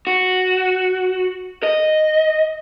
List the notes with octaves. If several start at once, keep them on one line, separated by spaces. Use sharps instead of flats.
F#4
D#5